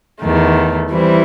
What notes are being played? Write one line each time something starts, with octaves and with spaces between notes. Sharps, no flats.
E2 D#3 A3
E3 G3 C4 E4